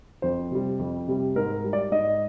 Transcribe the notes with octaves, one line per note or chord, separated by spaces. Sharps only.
F2 C5
C3 G3
F2
C3 G3
G#2 A#4
G3
D5
G#2 D#5